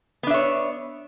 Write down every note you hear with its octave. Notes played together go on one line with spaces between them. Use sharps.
B3 D4 C#5 E5